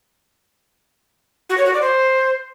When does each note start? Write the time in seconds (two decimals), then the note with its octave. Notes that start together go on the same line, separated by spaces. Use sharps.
1.49 F#4
1.57 C#5
1.65 F#4
1.73 D5
1.81 C5